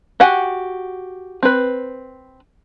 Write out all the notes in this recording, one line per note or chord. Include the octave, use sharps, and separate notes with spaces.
F#4 G4 F#5 G#5
C4 B4